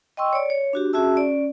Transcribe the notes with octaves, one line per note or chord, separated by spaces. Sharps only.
D#5 G5 C6 C#6 E6
C#5 D5
C#5
D4 F#4 G4
C#4 F#4 G#4 E5 A5 E6
C#4 D5